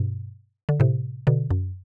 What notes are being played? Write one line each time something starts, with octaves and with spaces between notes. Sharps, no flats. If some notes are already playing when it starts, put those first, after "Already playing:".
Already playing: G2 B2
D3
A2 C3
B2 D3
F#2